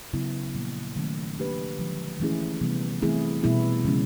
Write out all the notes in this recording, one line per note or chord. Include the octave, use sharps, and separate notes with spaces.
C#3 F#3 B3 E4
A#2 F3 A#3
D#3 F#3 A3 C#4
A#3 D4 G4 B4
D3 F3 G#3
E3 A3 C#4 E4 G#4
C3 E3 G3 B3
E3 A3 C4 E4 G#4
B2 G3 B3 E4 G#4
C#3 F3 G#3 C#4